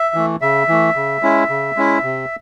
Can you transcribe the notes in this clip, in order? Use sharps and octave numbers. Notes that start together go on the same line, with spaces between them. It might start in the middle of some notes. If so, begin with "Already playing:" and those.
Already playing: E5
E3 A3
C#3 E5
E3 A3
C#3
G#3 C#4 E4
C#3
G#3 C#4 E4
C3